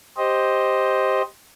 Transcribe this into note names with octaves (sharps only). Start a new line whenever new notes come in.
G4 C5 D#5